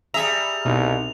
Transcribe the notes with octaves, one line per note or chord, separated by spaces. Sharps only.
G3 G#4 E5 A#5 F7
C2 B2 D#4